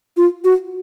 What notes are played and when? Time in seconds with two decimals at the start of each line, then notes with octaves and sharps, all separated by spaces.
0.17 F4
0.44 F#4